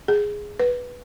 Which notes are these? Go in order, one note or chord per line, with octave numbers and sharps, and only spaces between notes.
G#4
B4